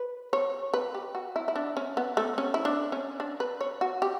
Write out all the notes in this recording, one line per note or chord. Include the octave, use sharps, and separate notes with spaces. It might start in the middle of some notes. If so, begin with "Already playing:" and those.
Already playing: B4
C#5
B4
G4
F#4
E4
E4
D4
C#4
B3
A3
C#4
E4
D4
C#4
D4
B4
C#5
F#4
G4